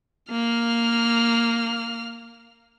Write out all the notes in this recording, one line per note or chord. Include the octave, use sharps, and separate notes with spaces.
A#3 F6